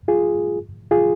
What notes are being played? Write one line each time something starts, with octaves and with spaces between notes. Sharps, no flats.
F4 G#4
F4 G#4